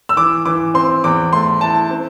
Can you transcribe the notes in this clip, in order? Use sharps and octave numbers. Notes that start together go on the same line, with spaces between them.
E6
E3 D6
E3 D6
C4 C6
E2 D6
A3 C6
E4 A5
C4